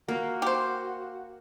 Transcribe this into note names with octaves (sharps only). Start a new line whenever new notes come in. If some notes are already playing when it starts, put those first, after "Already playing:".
A#3 F#4
G4 C5